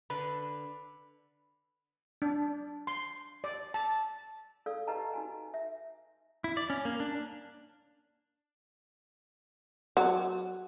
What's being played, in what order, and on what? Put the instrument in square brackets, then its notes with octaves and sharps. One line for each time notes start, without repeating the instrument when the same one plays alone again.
[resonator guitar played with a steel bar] D3 D4 B4 [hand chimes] B5
[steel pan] D4
C6
D5
A5
[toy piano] A4 D5 F5 E6
G4 B4 D#5 F#5 A5 A#5
D#4 F#4 G#5
E5
[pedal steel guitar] E4
D5
C#4
A#3
D4
[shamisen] F#3